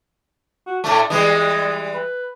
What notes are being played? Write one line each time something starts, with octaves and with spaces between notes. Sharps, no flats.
F#4
A2 A3 D4
E3 G3 G#3 D#5
B4